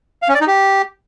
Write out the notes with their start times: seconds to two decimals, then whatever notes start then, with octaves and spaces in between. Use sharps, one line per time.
0.22 F5
0.28 C#4
0.35 D5
0.41 D#4
0.47 G4